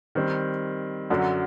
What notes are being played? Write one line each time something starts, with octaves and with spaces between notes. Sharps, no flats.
D#3 G3 C4
F#2 D3 F#3